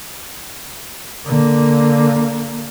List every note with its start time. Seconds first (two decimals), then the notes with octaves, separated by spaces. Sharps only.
1.26 D3 A#3